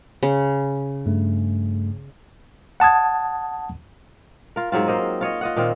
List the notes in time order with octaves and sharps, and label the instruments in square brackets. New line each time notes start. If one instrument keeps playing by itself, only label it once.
[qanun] C#3
[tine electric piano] G2 A3
F#5 A5 D#6 G#6
[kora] F4 A#4
G#2 F#3 C4 F4
A#3 C5 D#5
F4 C#5 D#5
F4 D#5 F#5
A#2 D#3 C4 F5